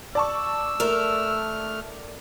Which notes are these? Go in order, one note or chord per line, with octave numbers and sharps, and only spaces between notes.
D5 A5 C#6 E6
A3 A4 A#4 F6